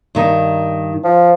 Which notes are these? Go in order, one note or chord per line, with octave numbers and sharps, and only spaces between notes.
G2 D#3 D#4
F3